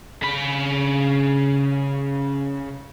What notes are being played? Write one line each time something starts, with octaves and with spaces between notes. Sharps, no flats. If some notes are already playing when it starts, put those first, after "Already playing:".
C#3 B5